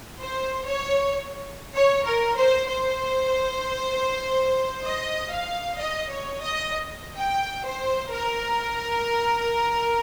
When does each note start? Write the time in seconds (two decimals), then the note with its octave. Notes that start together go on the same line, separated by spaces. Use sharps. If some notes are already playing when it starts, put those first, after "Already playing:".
0.19 C5
0.66 C#5
1.74 C#5
2.05 A#4
2.37 C5
2.67 C5
4.84 D#5
5.32 F5
5.79 D#5
6.10 C#5
6.40 D#5
7.18 G5
7.65 C5
8.11 A#4